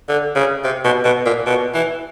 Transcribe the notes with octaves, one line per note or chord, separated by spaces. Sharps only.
D3
C#3
C3
B2
B2
A#2
B2
E3